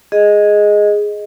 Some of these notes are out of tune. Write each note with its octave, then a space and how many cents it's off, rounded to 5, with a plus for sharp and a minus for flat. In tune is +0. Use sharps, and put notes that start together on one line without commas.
G#4 +0 D#5 +0